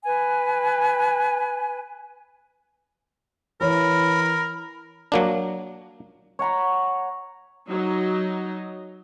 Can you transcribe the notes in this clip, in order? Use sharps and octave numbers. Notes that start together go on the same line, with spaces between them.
B4 G#5
E3 A#4 C#5 B5
F#3 A#3 D4
C#5 F#5 A#5 B5
F#3 D#4